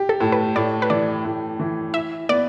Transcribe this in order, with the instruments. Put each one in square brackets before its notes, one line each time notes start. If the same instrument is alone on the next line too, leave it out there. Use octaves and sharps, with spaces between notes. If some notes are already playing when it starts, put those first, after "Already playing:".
Already playing: [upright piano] G4
[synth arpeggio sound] A4
[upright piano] A2
[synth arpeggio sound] B4
[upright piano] A2 [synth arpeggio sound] D5
[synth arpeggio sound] B4
[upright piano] E3 [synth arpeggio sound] D5
[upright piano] A2
E3
[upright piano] E4 [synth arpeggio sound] E5
[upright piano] B3 [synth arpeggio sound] D5